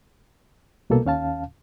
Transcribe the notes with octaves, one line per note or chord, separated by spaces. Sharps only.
C2 B2 A#3 A4
D#2 C#4 F5 A5